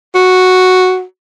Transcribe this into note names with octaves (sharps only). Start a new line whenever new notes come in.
F#4